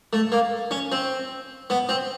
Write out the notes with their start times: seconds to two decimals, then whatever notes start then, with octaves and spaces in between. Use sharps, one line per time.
0.13 A3
0.32 A#3
0.71 C#4
0.92 C4
1.70 B3
1.89 C4